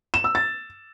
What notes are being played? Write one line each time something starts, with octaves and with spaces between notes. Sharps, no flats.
E7
E6
A6